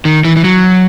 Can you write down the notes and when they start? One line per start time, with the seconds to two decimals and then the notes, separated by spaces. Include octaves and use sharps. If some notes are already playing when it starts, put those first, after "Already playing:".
0.05 D#3
0.25 E3
0.36 E3
0.44 F#3